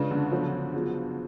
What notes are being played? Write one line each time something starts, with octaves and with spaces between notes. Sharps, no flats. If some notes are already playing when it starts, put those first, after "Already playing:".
Already playing: C#3 G#3 D4 F4 B4 D5
D3
F3 F#3 B3 F#4 A4 C#5
F#3 B3 F4 G#4